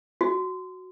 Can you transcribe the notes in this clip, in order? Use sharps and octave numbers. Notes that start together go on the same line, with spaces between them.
F#4